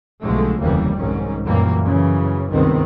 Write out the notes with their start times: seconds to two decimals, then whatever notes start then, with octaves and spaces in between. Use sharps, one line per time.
0.21 B1 D3 F3 G#3 A3
0.60 F1 D#2 C#3 E3 G3 A#3
0.95 C2 G#2 D#3 C#4
1.45 F#2 A#2 E3 G3 A#3
1.83 F#2 C#3 E3
2.52 C#2 G2 C3 D#3 B3 C4